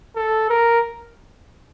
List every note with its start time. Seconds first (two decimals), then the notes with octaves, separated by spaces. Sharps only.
0.16 A4
0.50 A#4